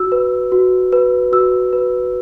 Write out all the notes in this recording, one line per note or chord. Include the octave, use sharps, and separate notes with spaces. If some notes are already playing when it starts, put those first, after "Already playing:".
Already playing: F#4 E6
B4
F#4
B4
F#4 E6
B4